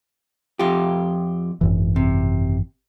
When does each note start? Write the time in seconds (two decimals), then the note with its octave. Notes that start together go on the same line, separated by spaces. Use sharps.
0.59 F2 F4 G4
1.61 G#1 F#2 E3
1.96 C3